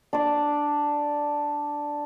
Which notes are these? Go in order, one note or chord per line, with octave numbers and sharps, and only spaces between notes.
D4 D5